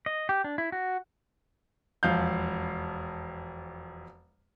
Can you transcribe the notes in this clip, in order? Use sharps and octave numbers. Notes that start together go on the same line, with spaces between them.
D#5
G4
D4
E4
F#4
E1 F2 F5 G6